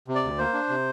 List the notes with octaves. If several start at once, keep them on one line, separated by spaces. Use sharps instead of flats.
C3
D5
D2
A#3 C5
D4
C3